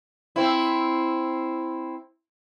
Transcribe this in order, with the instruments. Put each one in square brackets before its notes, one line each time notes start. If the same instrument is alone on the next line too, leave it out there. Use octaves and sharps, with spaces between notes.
[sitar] C4 E4